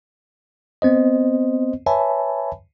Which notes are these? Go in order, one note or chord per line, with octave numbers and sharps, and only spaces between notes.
B3 C4 C5 D#5
B4 C#5 E5 G#5 A5 B5